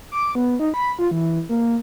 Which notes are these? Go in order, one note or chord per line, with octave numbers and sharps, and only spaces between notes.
D6
B3
D#4
B5
F4
E3
A#3